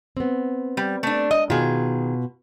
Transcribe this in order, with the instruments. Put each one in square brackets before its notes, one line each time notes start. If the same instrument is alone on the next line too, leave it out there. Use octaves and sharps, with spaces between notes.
[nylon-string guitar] B3 C4
[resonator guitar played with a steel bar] G3
A3 D4
[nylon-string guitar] G#3 [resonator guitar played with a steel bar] D#5
[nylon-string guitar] B2 F4 [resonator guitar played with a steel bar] D#3 G#4